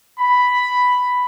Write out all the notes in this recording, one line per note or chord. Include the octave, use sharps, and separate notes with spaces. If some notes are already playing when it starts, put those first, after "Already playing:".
B5